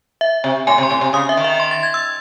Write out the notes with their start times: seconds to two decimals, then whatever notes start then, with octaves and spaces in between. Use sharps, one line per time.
0.21 E5
0.44 C3
0.67 A2 G#5
0.78 C3
0.83 C6
0.90 A2
1.01 C3
1.13 C#3 D#6
1.29 E5
1.37 D#3
1.44 E5
1.60 C6
1.71 A6
1.83 G#6
1.94 E6